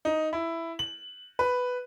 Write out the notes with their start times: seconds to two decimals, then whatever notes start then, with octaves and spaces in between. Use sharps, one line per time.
0.05 D#4
0.33 E4
0.79 F#7
1.39 B4